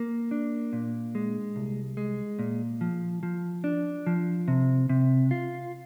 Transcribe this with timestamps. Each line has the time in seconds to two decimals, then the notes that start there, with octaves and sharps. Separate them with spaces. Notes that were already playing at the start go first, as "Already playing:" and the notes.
Already playing: A#3
0.31 D4
0.73 A#2
1.15 G#3
1.56 C2
1.97 G#3
2.39 A#2
2.81 F3
3.23 F3
3.64 D4
4.07 F3
4.48 C3
4.89 C3
5.31 F4